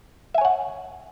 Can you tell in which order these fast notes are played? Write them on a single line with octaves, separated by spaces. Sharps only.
E5 G#5 C#5 F#5